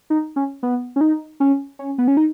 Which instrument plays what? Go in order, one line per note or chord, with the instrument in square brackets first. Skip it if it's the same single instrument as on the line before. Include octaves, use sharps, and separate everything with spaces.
[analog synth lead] D#4
C#4
B3
C#4
D#4
C#4
C#4
B3
C#4
D#4